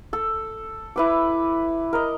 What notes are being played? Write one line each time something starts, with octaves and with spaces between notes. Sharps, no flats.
A4
E4 B4 D6
A#4 D#5